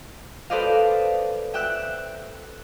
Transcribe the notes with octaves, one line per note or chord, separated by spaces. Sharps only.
A4 B4 C5 D5 D#5 F5
E5 G5 E6 F#6